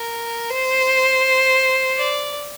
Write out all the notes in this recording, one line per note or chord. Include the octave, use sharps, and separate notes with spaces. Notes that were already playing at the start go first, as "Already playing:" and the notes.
Already playing: A#4
C5
D5